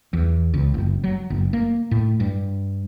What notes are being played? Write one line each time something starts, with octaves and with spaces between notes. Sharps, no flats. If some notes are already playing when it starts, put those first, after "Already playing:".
E2
C#2
F#1
F#3
F#1
A#3
A2
G2